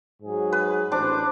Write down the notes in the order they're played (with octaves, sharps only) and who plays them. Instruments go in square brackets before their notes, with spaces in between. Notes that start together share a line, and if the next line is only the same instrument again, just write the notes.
[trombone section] G#2 F#3 G#4
[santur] B4
[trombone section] A1 C5 [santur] D4 D6